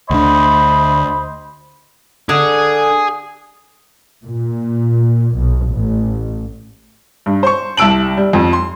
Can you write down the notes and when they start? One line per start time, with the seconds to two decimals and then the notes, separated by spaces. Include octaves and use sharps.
0.11 D2 D3 C5 D#5 B5
2.29 D3 G#4
4.24 A#2
5.35 B1
5.69 A1
7.26 G2
7.43 C5 C6 C#6
7.77 C2 A5 E6 D7 F#7
8.17 G3
8.33 F2
8.53 C6